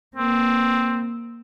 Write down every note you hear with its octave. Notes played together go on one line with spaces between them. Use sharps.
A#3 C4